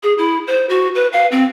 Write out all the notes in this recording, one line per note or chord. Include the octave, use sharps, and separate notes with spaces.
G#4
E4
C5
F#4
B4
F5
C4